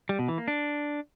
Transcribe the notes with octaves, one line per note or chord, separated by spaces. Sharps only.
G3
B2
E3
A#3
D4